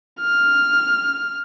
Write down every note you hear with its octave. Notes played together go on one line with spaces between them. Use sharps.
F6